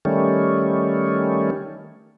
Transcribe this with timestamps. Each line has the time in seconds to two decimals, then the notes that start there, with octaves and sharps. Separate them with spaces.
0.05 D#3 G3 A3 C#4